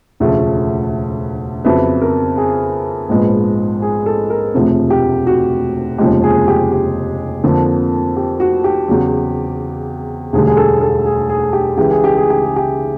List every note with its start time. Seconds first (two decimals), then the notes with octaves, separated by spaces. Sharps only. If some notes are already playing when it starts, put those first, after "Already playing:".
0.20 E1 D2 C#3 F3 A3
1.64 F2 C#3 F#3 B3 E5
2.01 A#4
2.37 G#4
3.09 A#1 G#2 F3 G#3 B3
3.82 G#4
4.06 A4
4.30 A#4
4.54 E1 D2 C3 F3
4.90 G4
5.27 F#4
5.98 F1 D#2 C#3 F3 G#3 G4
6.24 G#4
6.48 G4
6.71 G4
7.44 F2 D3 F3 A#3
8.17 G4
8.40 F#4
8.64 G4
8.88 E2 C#3 F#3
10.33 E1 D2 D3 G3 G#4
10.47 G#4
10.57 A4
10.81 A4
11.06 G#4
11.29 G#4
11.53 G4
11.77 C#2 C#3 E3 G4
11.91 G#4
12.04 G4
12.17 G#4
12.30 G4
12.44 G#4
12.56 G4